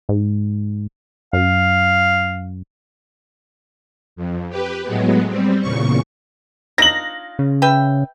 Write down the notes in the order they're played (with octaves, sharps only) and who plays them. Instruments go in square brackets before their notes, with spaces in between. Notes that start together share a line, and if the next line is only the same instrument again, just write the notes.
[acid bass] G#2
[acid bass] F#2 [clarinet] F5
[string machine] F2
G4 B4
A2 F#3 G#3 B3
G3 C4
E2 A#2 C#3 C#6
[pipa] D4 D#4 F4 [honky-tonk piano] A#6 F#7
[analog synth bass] C#3
[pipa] B4 E5 G5